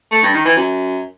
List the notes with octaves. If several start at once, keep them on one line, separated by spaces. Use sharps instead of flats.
A3
G2
D#3
E3
F#2